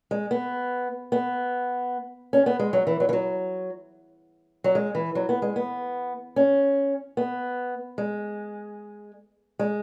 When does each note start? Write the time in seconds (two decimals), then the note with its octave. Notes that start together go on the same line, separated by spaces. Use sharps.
0.11 G#3
0.31 B3
1.12 B3
2.33 C#4
2.46 B3
2.59 G#3
2.73 F#3
2.87 E3
3.00 F#3
3.09 E3
3.13 F#3
4.64 F#3
4.75 G#3
4.95 E3
5.15 F#3
5.29 B3
5.42 G#3
5.56 B3
6.36 C#4
7.17 B3
7.98 G#3
9.59 G#3